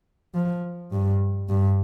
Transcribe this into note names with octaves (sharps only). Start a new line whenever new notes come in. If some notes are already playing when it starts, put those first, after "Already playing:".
F3
G2
G2